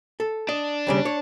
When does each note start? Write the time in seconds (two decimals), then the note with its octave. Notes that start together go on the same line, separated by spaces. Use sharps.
0.20 A4
0.49 D4 D#5
0.87 D#2 C#3 G3
1.05 C#5